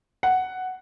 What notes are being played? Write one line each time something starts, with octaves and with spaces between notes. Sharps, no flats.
F#5